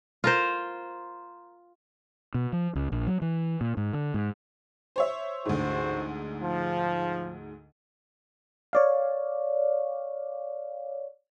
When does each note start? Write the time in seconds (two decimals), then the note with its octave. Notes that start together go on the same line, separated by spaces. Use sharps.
0.24 F4 A#4 C5
2.34 B2
2.53 F3
2.75 C#2
2.92 A#1
3.07 F#3
3.22 E3
3.61 A#2
3.77 G#2
3.93 D3
4.14 G#2
4.96 C5 C#5 E5
5.45 A1 D2 G#2 F#4 C5
6.40 F3
8.73 C#5 D5 F5